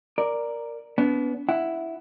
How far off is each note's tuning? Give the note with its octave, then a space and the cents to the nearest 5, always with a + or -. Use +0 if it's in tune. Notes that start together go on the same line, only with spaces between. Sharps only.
A#4 +0 D5 +0
B3 +5 D4 -40
E4 +0 F#5 +0